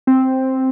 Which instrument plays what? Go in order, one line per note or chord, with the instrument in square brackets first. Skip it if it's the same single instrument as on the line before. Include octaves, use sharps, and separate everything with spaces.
[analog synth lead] C4